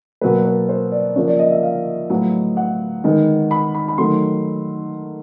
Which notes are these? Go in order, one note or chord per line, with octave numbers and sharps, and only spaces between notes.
B2 F#3 A#3 B4
B4
C5
D5
C#3 F3 A#3 C#5
D5
D#5
E5
F5
A2 F#3 B3
F#5
D#3 G#3 B3
B5
B5
B5
D#3 F#3 A3 C6